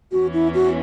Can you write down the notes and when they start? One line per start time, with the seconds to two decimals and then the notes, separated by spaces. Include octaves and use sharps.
0.12 E2 E3 C#4 F#4
0.33 E4
0.54 F#4